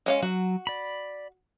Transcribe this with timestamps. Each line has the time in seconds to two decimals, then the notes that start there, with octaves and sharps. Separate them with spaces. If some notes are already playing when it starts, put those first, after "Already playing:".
0.06 G#3 C#4 F5
0.22 F#3 F#4
0.67 D5 B5